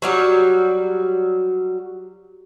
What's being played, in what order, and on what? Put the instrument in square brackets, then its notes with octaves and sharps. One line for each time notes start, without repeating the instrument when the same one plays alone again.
[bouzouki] F#3 G3 F#4